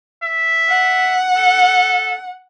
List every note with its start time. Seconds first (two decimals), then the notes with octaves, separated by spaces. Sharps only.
0.23 E5
0.69 F#5
1.38 A4